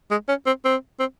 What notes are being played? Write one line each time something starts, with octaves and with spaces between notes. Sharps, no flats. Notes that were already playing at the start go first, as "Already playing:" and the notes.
G#3
C#4
C4
C4
C4